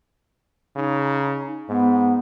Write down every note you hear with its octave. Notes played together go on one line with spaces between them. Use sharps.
C#3 D#4
G#2 B3